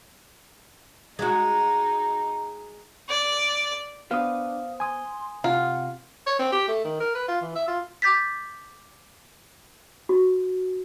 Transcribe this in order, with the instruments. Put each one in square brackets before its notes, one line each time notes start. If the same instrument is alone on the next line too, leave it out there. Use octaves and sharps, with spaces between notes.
[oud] G#3 F#4 [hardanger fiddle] D#4
[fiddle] D5
[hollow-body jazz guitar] B3 B4 C5 [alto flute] D4 [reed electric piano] F5 D#6
[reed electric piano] G#5 D#6 [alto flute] C6
[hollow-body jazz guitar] C3 [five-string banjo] F4 [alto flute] F#5
[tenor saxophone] C#5
C4
G4
A3
D#3
A#4
B4
F4
E3
E5
F4
[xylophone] D6 G6 A6 B6
[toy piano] F#4